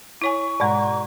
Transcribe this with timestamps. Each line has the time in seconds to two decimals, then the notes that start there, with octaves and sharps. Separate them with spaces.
0.22 E4 C#5 G#5 C#6
0.60 G#2 B2 G#3 D5 F#5 A#5